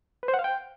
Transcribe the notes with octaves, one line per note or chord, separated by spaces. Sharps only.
B4
C5
F#5
F5
G5